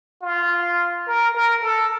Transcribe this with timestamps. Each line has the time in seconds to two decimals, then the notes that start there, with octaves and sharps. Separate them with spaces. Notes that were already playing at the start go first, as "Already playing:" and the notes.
0.22 F4
1.07 A#4
1.34 A#4
1.62 A4